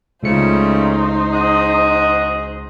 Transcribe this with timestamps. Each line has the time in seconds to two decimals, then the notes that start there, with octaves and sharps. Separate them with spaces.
0.23 C#2 C#3 G3 A3 D#4 C5 C#7
1.33 F#4 G#4 D#5